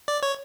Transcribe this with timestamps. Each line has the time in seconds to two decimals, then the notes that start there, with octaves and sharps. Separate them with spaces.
0.08 D5
0.23 C#5